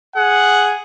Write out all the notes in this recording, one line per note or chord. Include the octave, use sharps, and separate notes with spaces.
G#4 F#5